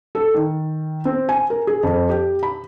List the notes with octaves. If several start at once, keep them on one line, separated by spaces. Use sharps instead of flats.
A4
D#3
C4
G#5
A#4
G#4
F2
G4
B5